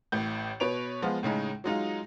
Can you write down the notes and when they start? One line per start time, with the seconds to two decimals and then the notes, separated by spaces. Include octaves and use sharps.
0.12 A1 A2 G6
0.60 B2 B4 C#5 D7 F7
1.02 F3 G#3 B3 F4
1.23 A2 C#3 G#3 D#4
1.64 F#3 G#3 D#4 F4